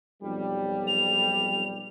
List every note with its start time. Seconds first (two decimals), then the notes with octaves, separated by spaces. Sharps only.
0.23 B1 F2 G3
0.88 F7